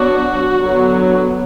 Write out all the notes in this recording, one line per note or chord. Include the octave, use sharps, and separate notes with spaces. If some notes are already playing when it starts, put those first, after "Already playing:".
Already playing: F#3 B3 D4 F#4
D3 F#3 B3